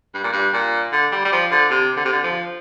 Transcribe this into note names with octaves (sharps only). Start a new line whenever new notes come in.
G2
A#2
G2
A#2
D3
G3
G3
F3
D3
C3
D3
C3
D3
F3